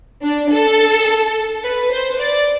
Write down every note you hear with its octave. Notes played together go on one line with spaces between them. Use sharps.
D4
A4
B4
C5
D5